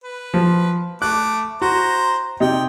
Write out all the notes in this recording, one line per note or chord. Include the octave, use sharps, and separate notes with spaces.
B4
F3
A3 D6 F#6
F#4 C5 A#5
C3 D#4 G5